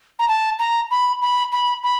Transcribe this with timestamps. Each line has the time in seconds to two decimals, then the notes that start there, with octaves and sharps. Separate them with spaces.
0.19 A#5
0.28 A5
0.59 A#5
0.91 B5
1.21 B5
1.52 B5
1.83 B5